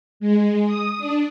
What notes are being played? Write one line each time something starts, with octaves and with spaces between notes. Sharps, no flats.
G#3
D#6
D4